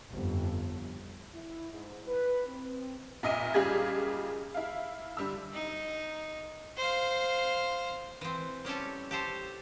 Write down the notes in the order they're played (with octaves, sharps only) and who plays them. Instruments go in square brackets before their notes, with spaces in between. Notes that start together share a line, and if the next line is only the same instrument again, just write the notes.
[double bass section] G1 F2
[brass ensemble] E4
G#2
B4
C4
[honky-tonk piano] F1 A#2 D#5 E5 D#7
F#1 G3 F4 G4 G#4 G#6
E4 F5
D3 G3 E6
[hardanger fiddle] D#4
C5 F5
[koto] E3 C4
G3 C#4 G4 A4
G4 A4 C5